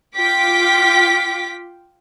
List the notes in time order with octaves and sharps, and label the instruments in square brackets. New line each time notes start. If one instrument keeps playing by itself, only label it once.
[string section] F4 G5 D6 B6